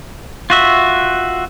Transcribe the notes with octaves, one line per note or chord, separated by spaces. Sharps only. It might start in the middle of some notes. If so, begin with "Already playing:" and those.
F4 F#4 E5